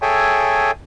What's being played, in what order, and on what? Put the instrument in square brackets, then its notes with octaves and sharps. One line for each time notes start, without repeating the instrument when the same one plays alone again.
[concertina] G#4 A4 C#5 E5 G5 G#5